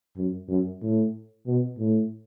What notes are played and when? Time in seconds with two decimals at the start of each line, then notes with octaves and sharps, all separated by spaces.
0.17 F#2
0.48 F#2
0.82 A2
1.46 B2
1.78 A2